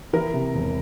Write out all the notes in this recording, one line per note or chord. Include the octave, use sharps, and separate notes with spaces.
E3 A#4
C3
E1